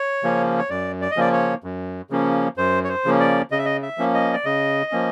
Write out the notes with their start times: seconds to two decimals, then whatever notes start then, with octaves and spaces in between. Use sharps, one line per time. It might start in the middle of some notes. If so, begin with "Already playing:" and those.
Already playing: C#5
0.23 C#3 F3 A#3 C#4
0.58 C#5
0.70 F#2 D5
1.01 D5
1.11 D#5
1.17 C#3 F3 A#3 C#4 D5
1.32 C#5
1.64 F#2
2.10 C#3 F3 A#3 C#4
2.57 F#2 C5
2.84 C#5
2.89 C5
3.05 C#3 F3 A#3 C#4
3.20 D5
3.51 C#3 D#5
3.58 E5
3.65 D#5
3.82 E5
3.98 F3 A#3 C#4
4.14 D#5
4.33 D5
4.45 C#3 D#5
4.92 F3 A#3 C#4